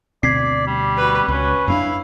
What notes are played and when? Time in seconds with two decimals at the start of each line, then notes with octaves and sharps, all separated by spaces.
0.23 D2 B2 C4 D5 G#6 B6 C7
0.67 G3
0.97 F#4 B4
1.28 C#2 C#4 F#4 B4
1.68 F#2 C4 D4 E4 F5